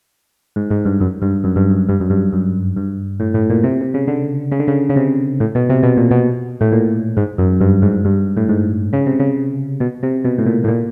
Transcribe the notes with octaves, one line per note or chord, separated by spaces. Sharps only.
G#2
G#2
G2
F#2
G2
F#2
G2
F#2
G2
F#2
G2
F#2
G2
A2
A2
A#2
C3
C3
C#3
D3
C#3
D3
C#3
C#3
C3
A2
B2
C3
B2
A#2
B2
A2
A#2
G#2
F#2
G2
G#2
G2
A2
G#2
C#3
C3
C#3
B2
C3
B2
A2
A#2
A2
A#2